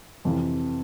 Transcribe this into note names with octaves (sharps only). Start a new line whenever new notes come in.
F2 C3 E3